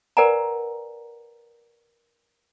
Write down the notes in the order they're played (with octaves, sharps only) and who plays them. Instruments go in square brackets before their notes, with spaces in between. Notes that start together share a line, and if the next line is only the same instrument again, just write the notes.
[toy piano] A#4 B4 D5 F#5 G#5 A#5